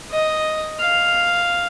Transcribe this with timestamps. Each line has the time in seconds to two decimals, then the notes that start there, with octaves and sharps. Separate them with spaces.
0.11 D#5
0.81 F5